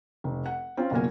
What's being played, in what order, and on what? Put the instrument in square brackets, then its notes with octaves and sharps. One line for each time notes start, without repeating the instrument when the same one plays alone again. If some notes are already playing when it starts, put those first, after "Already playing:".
[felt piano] F1
F#5
C4 C#4 F4
F#1 B2 A#3 F#4 A#4 G#5